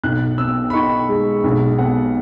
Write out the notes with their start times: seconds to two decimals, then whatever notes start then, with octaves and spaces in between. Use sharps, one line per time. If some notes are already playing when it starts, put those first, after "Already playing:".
0.03 B1 F#6
0.38 B2 E6
0.70 B5
0.73 D#4 C#6
1.09 G#3
1.44 B1
1.78 B2 F#5